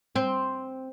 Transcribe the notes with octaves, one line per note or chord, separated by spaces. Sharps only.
C4